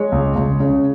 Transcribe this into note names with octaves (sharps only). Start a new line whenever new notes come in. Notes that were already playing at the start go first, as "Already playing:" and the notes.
Already playing: G#3 C#5
C#2
C#2
C#3